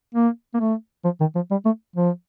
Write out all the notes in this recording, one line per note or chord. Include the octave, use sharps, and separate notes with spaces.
A#3
A#3
A3
F3
D#3
F3
G3
A3
F3